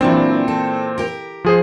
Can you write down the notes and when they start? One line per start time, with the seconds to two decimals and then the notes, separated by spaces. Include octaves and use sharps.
0.01 A#2 E3 F#3 C4 D4
0.48 A4
0.98 G4 A#4
1.44 F3 G#4 C5